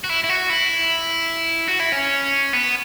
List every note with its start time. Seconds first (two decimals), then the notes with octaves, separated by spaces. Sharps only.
0.04 F#4
0.09 E4
0.24 E4
0.29 F#4
0.50 E4
1.68 F#4
1.80 E4
1.92 C#4
2.53 B3